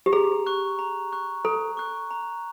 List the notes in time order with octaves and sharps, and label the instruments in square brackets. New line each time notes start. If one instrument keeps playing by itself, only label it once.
[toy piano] G4
[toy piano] G#4 [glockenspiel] A#5
[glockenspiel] C#6 F#6
A#5
C#6 F#6
[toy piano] A4 [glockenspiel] A#5
[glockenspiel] C#6 F#6
A#5